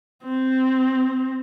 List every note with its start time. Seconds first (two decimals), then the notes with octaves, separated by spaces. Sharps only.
0.24 C4